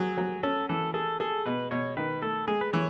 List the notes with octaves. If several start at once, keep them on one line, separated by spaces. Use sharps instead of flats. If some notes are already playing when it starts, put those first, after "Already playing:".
Already playing: F#3 G#4
F#3
C#4 A4
E3 A4
G#4 A4
G#4 A4
B2 B4
B2 C#5
D#3 B4
A3 A4
G#3 G#4
B4
E3 C#5